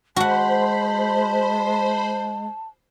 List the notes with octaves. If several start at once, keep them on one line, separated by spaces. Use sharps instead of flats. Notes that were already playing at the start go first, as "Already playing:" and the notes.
G#3 F#4 C5 F#5 A5 B5